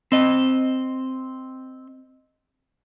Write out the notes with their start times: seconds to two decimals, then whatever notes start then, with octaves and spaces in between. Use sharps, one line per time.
0.12 C4 D#5